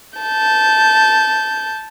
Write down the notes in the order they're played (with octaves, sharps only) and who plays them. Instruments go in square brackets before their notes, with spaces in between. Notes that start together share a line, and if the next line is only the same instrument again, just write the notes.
[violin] A5 G6